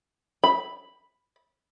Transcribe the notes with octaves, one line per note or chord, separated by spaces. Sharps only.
B5